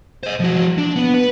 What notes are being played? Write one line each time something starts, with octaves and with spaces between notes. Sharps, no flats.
C5 D#5
F3 F#4
D4
B3
B4